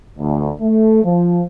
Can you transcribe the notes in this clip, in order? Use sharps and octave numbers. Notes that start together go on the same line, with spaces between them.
D2
A3
F3